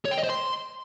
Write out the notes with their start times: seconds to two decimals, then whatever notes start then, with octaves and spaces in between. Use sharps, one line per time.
0.05 C#5
0.11 G5
0.17 D#5
0.23 C5
0.30 C6